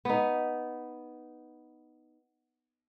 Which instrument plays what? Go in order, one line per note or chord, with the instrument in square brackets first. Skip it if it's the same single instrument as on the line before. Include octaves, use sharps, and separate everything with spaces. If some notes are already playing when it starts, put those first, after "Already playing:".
[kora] B3 D#4